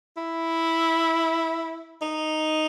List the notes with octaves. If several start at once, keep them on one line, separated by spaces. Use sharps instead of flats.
E4
D#4